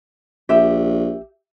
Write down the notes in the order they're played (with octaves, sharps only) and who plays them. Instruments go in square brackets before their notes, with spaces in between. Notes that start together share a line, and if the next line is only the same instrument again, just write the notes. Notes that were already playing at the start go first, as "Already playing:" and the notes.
[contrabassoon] A#1 [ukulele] G4 E5